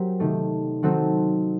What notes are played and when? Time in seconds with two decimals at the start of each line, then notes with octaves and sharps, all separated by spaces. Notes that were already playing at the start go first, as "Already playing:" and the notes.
Already playing: F#3 C4 G4 A#4
0.20 C3 D#3 A3
0.83 D#3 F#3 C4 F#4 A4